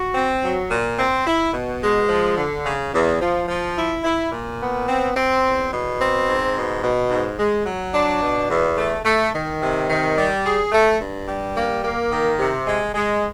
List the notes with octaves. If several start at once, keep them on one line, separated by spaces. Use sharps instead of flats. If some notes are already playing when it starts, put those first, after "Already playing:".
Already playing: F#4
C4
F#3
A#2
C4
E4
B2
G#3
F3
D3
C#3
E2
F3
F3
E4
E4
A#2
B3
C4
C4
E2
B2
C4
G#2
B2
B2
G#2
G#3
F#3
D4
B2
E2
A3
A3
D#3
C3
D#3
G3
G#4
A3
G2
G3
A#3
A#3
D#3
C3
G#3
G#3